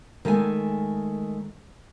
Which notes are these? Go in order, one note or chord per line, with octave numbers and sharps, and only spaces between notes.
D#3 G#3 A3 E5 G#5